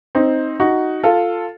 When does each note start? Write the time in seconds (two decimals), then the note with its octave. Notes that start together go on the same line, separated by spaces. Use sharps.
0.15 C4 D#4
0.60 D#4 F#4
1.03 F4 A4